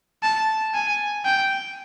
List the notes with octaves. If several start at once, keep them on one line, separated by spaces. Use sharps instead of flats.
A5
G#5
G5